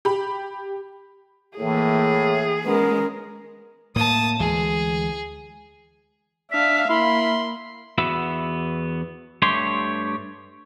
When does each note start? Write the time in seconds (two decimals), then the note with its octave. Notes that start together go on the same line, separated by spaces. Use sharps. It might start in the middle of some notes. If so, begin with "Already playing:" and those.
0.05 G4 B5
1.58 A2 E3 A#3 G#4
2.65 G#3 B3 C#4 A#4
3.96 A2 A#3 A5 D#6
4.40 D2 E3 G#3 G#4
6.52 D4 E5 F5 B6
6.89 A#3 E4 B5 C6
7.98 E2 B3 F#4 B4 E5
9.42 G2 A3 G4 C#5 C6